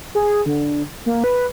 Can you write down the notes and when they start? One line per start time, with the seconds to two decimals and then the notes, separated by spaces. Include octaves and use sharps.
0.15 G#4
0.46 D3
1.06 A#3
1.24 B4